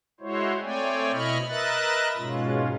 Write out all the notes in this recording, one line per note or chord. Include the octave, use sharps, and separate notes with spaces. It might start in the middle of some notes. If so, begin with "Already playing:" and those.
G#3 E4 F#4 C5 C#5
A3 C4 C#5 D5 G5 G#5
B2 E4 D#5 B5 C#6 F6
A#4 B4 D#5 E5 F#6 A6
G#2 B2 G#3 C#4 F4